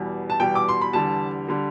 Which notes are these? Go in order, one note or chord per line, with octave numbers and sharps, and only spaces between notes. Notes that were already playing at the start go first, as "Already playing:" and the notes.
Already playing: E2 B2 G3
A5
E2 B2 G3 G5
D6
C6
B5
E2 D3 G3 A5
D3 G3